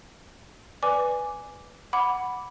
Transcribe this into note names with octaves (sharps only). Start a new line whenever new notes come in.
B4 D5 G#5 D6
F#5 B5 D6